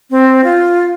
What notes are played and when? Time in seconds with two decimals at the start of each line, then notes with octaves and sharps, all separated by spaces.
0.10 C4
0.44 F4